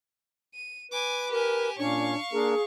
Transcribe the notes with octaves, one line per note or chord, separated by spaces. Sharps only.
D#7
B4 G#5 D6
G4 A#4 G#5
A#2 C#4 D4 C#5 F5 C#6
A#3 D4 G#4 A#4